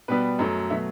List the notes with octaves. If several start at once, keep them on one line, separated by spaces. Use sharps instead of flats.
B2 G3 B3 B4
F#2 F#3 A3
B2 F#3 A3 E5